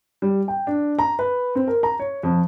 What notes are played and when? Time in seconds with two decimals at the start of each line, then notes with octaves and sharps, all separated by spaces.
0.22 G3
0.48 G5
0.67 D4
0.99 A#5
1.19 B4
1.55 C4
1.68 A#4
1.83 A#5
1.99 C#5
2.23 F2